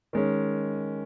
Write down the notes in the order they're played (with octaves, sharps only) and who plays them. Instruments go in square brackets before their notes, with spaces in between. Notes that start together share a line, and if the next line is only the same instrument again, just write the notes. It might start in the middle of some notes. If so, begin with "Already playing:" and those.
[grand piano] D#3 G#3 C#4